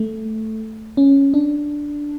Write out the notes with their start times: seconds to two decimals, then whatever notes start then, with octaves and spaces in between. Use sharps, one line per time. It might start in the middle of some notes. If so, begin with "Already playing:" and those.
Already playing: A3
0.97 C#4
1.34 D4